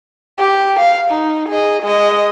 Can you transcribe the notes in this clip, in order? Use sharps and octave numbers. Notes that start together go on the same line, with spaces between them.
G4
F5
D#4
G#4 D#5
G#3 D#5